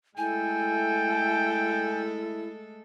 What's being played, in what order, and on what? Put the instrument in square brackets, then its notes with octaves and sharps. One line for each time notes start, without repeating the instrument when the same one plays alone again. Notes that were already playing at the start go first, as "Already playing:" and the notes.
[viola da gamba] G#3 A3 A4 [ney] E4 [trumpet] G5 [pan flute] G#5